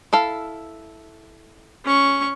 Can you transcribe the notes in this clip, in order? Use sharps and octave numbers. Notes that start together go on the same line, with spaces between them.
E4 A4 F5
C#4 C#6